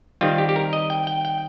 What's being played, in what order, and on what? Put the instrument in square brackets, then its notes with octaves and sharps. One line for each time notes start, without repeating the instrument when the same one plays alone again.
[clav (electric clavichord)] D#3 G3 C4 F4
G4
G4
A#4
D#5
G5
G5
G5